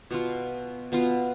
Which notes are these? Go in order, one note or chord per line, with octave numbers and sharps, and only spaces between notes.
B2 B3 F4
B2 B3 F4